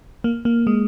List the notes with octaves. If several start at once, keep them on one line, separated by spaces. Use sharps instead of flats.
A#3
A#3
G#3